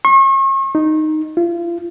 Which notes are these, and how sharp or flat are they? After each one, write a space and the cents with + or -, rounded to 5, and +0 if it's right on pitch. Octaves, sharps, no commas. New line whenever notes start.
C#6 -40
D#4 -5
F4 -35